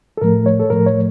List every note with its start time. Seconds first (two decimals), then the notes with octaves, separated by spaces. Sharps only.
0.17 A4
0.21 A2 F3 A3 A#4
0.46 C#5
0.59 A4
0.70 A2 F3 A3 A#4
0.87 C#5